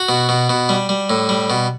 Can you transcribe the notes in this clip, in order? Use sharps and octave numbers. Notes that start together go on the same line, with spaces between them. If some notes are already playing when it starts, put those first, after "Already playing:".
Already playing: F#4
B2
B2
B2
G3
G3
A2
G3
B2